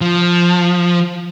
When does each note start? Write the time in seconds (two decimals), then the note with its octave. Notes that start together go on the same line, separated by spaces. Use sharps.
0.01 F3